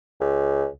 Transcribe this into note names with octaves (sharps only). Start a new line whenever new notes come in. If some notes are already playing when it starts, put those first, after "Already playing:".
C#2